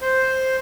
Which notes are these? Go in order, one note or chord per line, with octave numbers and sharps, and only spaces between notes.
C5